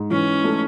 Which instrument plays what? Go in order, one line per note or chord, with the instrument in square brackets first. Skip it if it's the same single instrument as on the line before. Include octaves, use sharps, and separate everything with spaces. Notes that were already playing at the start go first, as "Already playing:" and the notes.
Already playing: [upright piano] G#2
[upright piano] E3 [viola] C#4
[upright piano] A3